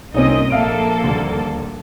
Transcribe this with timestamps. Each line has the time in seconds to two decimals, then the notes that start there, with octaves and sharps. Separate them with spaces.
0.14 C2 A#2 C4 C#4 D#4 D#5
0.50 A#1 A#3 A4 E5 F5 D7
1.03 D#1 D2